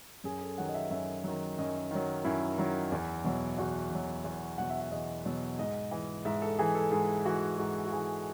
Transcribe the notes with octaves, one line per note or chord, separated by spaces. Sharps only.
F#2 G#4
A4
D#3 F#3 F#5
D#5
E5
F#2 E5
D#3 F#3
F#2 D#5
D#3 F#3
F#2 E4
D#3 F#3
E2
B2 F#3
E2 F#4
B2 F#3
E2
B2 F#3 F#5
E5
F#5
E2 D#5
B2 F#3
G#2 D#5
E3
G#2 E5
A4
E3 G#4
A4
G#2 G#4
E3 F#4
G#2 F#4
F#4
E3 G#4